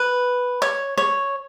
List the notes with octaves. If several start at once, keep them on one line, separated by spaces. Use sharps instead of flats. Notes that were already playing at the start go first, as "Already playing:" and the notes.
Already playing: B4
C#5
C#5